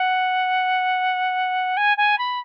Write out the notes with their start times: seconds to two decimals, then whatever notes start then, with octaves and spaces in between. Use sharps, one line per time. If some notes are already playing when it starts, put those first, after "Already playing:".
Already playing: F#5
1.77 G#5
1.97 G#5
2.18 B5